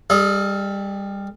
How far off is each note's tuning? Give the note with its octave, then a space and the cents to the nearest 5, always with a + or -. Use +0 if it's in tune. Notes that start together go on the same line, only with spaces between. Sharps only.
G3 +20 A4 -40 D#5 +0